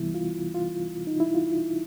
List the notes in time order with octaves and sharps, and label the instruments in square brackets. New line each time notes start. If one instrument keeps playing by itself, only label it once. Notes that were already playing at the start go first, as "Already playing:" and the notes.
Already playing: [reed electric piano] C2 C3 E3 G3 B3 E4
F4
F4
D#4
E4
F4